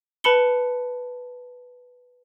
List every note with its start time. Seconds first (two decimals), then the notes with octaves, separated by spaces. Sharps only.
0.24 B4 A5 B5 C#7 G7